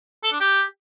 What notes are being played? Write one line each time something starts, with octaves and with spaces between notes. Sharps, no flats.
A4
D4
G4